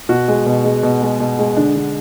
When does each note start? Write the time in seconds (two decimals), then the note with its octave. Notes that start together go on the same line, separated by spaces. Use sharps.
0.09 B2 F#4
0.28 G#3
0.46 B2
0.64 G#3
0.83 B2
1.02 G#3
1.20 B2
1.39 G#3
1.57 D3 D4
1.76 D3